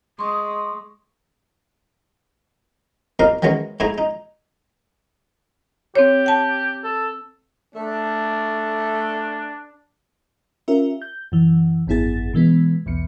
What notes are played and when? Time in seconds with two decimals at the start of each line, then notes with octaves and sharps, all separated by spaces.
0.19 G#3 C6 C#6 D#6
3.19 C2 A#3 D#4 D#5 F5
3.42 D#3 E3 F#3 G#3 C#4
3.80 G#2 A3 E4 G#4 G#5 A#5
3.98 D#4
5.95 C4 G4 C#5
6.26 G5 A5
6.84 A4
7.75 A3 D4
10.68 C#4 F4 G4 A#4 E5
11.02 G6
11.32 F#2 E3
11.87 G#1 F#2 B3 E4 G#4 A6
12.33 B2 E3 G#3 B3
12.86 B1 E2 B2 C#7